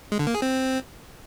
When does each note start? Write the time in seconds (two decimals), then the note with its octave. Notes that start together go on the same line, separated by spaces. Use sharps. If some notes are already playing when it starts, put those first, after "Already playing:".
0.12 G#3
0.19 D3
0.27 A#3
0.35 G#4
0.42 C4